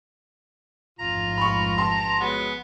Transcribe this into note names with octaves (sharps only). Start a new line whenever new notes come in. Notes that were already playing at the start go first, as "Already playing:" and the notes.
A1 F2 G#2 F4 A#5
B5 C#6
G4 A5 C6
F#3 G#3 B3